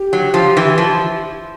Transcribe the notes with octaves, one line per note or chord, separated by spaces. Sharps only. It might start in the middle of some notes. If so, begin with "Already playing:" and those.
Already playing: G4
F#3
F3
E3
F3